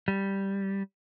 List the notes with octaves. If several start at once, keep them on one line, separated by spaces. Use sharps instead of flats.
G3